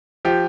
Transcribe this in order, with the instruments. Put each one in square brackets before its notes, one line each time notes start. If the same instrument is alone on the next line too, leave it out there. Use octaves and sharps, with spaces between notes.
[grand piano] F3 G4